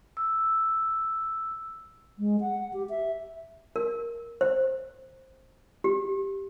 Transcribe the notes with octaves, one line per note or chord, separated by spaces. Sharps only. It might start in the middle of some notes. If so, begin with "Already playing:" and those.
E6
G#3
F#5
G4
E5
A#4
C5
G4